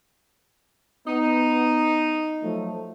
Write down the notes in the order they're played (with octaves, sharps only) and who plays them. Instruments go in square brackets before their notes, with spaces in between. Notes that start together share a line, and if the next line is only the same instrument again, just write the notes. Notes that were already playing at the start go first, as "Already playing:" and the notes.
[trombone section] B3 [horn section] D#4
[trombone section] F3 F#3 A3